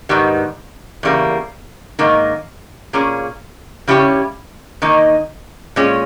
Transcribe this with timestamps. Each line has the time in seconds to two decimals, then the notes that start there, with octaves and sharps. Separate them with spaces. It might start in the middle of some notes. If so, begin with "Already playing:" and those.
0.09 G#2 D#3 G3 B3
1.03 E2 C#3 G3 A#3
1.99 G#2 D#3 A#3 D#4
2.93 A#2 A#3 C#4 G#4
3.87 C#3 G3 C#4 E4 G4
4.82 D#3 A#3 D#4
5.76 A#2 G#3 C#4